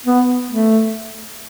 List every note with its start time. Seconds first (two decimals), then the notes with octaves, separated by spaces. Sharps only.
0.06 B3
0.51 A3